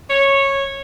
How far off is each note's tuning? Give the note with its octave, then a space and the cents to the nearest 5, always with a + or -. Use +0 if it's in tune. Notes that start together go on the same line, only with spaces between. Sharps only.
C#5 -10